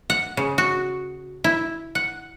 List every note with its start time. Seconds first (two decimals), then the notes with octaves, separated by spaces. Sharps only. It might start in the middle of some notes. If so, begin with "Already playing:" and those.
0.10 F#5
0.37 C#3
0.58 F#4
1.44 E4
1.95 F#5